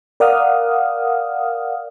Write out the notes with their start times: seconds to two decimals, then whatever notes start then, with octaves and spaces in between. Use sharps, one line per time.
0.20 A#4 D5 F5 F#5 D#6 F6